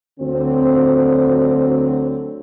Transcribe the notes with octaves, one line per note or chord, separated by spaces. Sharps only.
D2 D3 F#3 C4